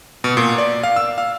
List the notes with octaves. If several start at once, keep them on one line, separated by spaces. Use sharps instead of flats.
B2
A#2
D5
F5
E6
F5